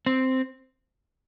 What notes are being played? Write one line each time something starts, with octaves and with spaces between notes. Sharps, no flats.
C4